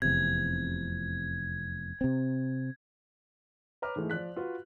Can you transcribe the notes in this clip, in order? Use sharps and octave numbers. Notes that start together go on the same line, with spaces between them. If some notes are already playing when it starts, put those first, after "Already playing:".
F1 E2 C3 G#6
C3 C4
B4 C#5 A#5 D6 F6
G#2 E3 G#3 A3
F3 D5 F#6 B6
F4 F#4 B4